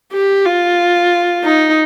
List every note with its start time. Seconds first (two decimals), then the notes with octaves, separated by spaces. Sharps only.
0.13 G4
0.46 F4
1.45 D#4